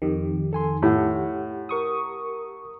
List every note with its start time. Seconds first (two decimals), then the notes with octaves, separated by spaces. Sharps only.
0.02 F2 D#3 G4
0.53 A4 G#5 C6
0.82 A2 G4 F#5
1.69 A#4 C#6 D#6